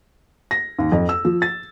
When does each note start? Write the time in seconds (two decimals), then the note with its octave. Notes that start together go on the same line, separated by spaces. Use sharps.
0.51 A#6
0.79 D#2
0.92 F2
1.09 E6
1.25 F3
1.42 A6